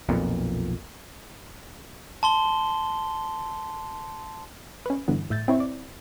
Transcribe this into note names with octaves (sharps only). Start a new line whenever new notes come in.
B1 F2 A#2
A5 C6 G7
C#4 B4
G2 D3 E3 B3
A2 E5 G6 A6
C4 E4 C#5
D5